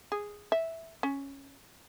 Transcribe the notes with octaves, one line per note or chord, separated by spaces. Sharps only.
G#4
E5
C#4